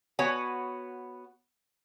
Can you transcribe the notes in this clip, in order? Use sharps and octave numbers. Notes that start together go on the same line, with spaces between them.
B3 F#4 C#5 G#5